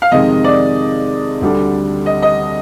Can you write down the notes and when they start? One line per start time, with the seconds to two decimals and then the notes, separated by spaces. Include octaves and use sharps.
0.02 F5
0.12 F2 C3 D#3 G#3 D#5
0.44 D5
1.41 D2 D3 G3 D4
2.06 D#5
2.22 D#5